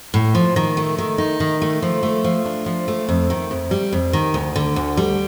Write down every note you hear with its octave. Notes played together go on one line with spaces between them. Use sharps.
A2
F3
D#3
A3
D#3
D#4
D#3
A3
F3
A3
F3
D4
F3
A3
F2
D#3
F2
G3
F2
D#3
D2
D3
D2
G3